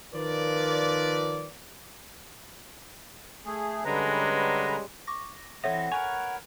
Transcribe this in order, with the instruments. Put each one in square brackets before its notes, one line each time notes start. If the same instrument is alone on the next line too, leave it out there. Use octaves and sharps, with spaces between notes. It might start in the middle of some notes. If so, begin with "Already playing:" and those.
[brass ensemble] D#3 F3 F4 A#4 B4 D5
[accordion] A3 G#4
[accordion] D3 B4 A#5 [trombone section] G3 G#3 C#4
[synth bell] C#6 D6 A#6
[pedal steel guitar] E3 C4 D#5 [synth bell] A4 C#5 E5 [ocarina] F#5
[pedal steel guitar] A#4 B4 C#5 [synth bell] G#5